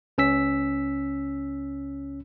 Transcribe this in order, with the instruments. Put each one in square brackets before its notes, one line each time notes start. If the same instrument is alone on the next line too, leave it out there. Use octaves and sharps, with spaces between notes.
[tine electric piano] C#2 C#4 E6 B6